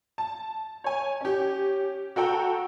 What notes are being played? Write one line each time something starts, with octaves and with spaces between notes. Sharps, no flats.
A5
C#5 G#5
C#4 G4
F#4 A4 G5 A#5